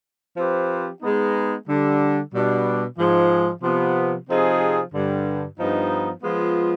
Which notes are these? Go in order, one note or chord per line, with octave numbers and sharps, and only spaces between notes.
F3 C4 G4 B4
G#3 B3 D#4
D3 G3 D4
B2 G3 D4
G#2 F3 G#3
C3 F3 B3
C3 F3 C4 D#4 G#4
G2 D3 G3
G2 F3 B3 D#4
F3 G#3 B3 F4